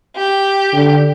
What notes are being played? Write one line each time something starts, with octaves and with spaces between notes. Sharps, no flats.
G4
D3